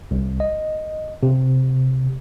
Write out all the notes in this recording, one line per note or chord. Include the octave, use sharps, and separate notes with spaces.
C2
D#5
C3